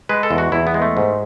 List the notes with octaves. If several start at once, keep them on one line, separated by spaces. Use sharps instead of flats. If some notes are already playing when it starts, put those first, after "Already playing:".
G#3 B4
A4
E2
F#4
E2 E4
B3
G#3
A3
G#2